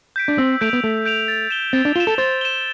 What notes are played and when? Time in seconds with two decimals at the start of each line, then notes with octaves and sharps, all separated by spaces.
0.16 G6 B6 D7
0.28 D4
0.38 C4 E6
0.61 A3 G6 D7 F7
0.73 B3
0.84 A3 E6
1.06 G6 D7 F7
1.28 A6
1.51 E7 G7
1.73 C4 A6
1.85 D4
1.95 F4 G7
2.00 E7
2.07 A4
2.18 C5 A6
2.41 E7 G7